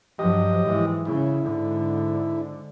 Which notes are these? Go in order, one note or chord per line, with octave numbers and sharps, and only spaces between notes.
G2 F3 F#3 G4 D#5
G#2 E3 G#3
C#3 E4
G#2 D3